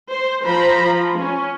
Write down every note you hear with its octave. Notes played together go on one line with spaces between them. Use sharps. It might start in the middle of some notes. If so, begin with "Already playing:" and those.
C5
F3 C5 A#5 B5
F3
C#4